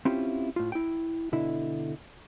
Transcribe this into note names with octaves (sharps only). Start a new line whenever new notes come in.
C4 C#4 E4 F4 G4 B5
A2 F4
E4 G5
B2 D3 E4